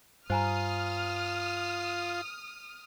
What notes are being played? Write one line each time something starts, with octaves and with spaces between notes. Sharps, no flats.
G2 F4 C5 G#5 A#5 D#6 F6